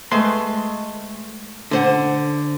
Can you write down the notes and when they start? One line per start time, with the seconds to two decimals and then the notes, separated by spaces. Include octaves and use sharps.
0.12 G#3 A3 B4 C6
1.71 D3 C5 F#5